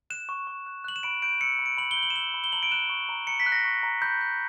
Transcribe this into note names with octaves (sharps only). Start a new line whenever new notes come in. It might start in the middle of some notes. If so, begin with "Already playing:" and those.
F#6 E7
C#6
C#6
F#6
F#6 F#7
E7
B5 D7
G6 D7
E6 C#7
B5
D7
B5 F#7
G7
G6
F#7
E7
E6 F#7
B5
G7
A#5 F#7
D7
F#6 E7
C#6
A#5
A#5 C#7
B6
F#6
A#6
C#6
A#5
B5 G6
G6